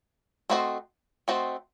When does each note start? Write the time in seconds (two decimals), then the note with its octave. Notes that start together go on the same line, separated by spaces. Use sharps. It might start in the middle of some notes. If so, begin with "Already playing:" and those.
0.50 A3 C4 F#4 C5 D#5
1.28 A3 C4 F#4 C5 D#5